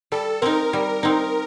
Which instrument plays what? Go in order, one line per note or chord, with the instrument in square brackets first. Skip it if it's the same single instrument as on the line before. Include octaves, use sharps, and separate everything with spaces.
[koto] G3 [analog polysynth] A4
[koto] C4 D#4 [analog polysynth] A#4
[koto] G3
C4 D#4